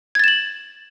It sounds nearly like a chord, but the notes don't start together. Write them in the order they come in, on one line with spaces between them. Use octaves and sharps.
G#6 A6 E7 F#7